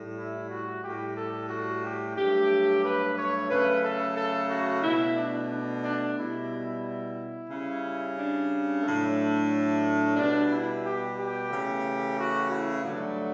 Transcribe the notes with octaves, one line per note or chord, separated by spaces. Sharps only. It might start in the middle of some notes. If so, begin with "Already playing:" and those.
Already playing: A2 G3
E4
F#4
A2 G3 G4
A4
F#4
G4
G2 F#3 A3 G4
B4
C#5
C#3 F#3 A3 B4
A4
A4
F#4
B2 A3 E4
D4
D4
D4
B2 G3 E4
E4
C#3 G3
D4
A2 F#3 A3
B2 G3 D4
E4
G4
G4
C#3 E3 A3
F#4
E4
G2 D3 F#3 A3 D4